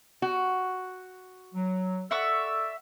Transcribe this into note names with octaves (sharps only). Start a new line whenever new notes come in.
F#4
F#3
A4 D5 E5 F#5 C#6 E6